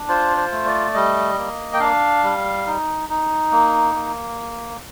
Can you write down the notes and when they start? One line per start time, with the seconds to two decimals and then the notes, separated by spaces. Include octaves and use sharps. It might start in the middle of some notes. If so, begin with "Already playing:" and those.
Already playing: D4
0.08 F4 C5
0.37 C5
0.52 A3
0.65 D5
0.94 G3 D#5
1.38 A#3
1.74 G5
1.80 D4 F5
2.23 G3
2.67 D#4
3.09 D#4
3.52 A#3
3.95 A#3